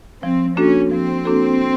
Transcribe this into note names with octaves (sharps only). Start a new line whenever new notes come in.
F3 C4
A#3 C#4 D4 F#4 A4
F3 C4
A#3 D4 F#4 A4